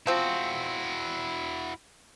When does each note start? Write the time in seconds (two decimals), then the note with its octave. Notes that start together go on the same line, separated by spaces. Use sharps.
0.07 F3 C4 E4 F#4